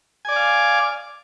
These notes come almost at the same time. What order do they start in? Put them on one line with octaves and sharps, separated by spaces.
G#5 D5 D6 F5